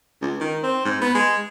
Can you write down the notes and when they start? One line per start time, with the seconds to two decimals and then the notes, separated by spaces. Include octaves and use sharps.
0.22 C#2
0.40 D#3
0.63 C4
0.85 G#2
1.01 B3
1.15 G#3